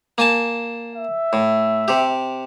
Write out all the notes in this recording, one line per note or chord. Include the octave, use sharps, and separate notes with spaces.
A#3 G#5 A5
E5
A2
C3 G4